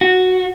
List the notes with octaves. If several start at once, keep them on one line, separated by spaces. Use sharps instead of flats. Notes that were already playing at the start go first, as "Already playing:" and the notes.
F#4